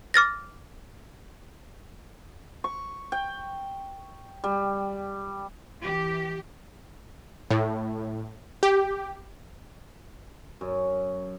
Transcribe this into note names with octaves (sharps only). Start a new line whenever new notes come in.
D6 F6 A6 A#6
C#6
G5
G3
E3 G4
A2
G4
F#2